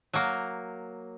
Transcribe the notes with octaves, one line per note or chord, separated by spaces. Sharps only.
F#3 A#3